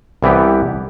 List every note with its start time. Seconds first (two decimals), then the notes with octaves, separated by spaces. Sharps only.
0.23 C2 E3 B3 G4